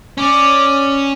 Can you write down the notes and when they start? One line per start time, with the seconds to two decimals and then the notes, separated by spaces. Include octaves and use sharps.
0.18 C#4 D5 D6